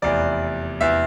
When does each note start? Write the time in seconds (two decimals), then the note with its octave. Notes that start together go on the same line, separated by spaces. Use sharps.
0.02 F1 E2 E3 D5
0.81 E2 E3 E5